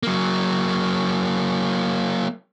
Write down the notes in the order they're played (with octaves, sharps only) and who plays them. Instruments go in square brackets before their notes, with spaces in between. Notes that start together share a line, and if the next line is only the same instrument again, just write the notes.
[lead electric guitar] F#3 A#3